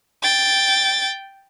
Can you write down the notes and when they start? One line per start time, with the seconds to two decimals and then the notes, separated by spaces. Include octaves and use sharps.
0.23 G5 A6